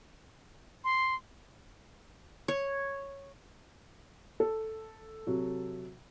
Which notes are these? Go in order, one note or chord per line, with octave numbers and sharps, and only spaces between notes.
C6
C#5
A4
C3 F#3